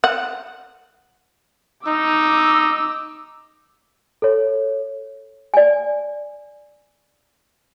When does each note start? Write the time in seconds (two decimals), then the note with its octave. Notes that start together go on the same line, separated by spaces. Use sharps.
0.04 F#5
1.87 D#4 D6 E6
4.22 A4 C#5
5.54 D5 G#5